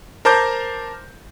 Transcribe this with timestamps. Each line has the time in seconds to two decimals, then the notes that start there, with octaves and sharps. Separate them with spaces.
0.25 A#4 C5 A5 A#5 D6 G6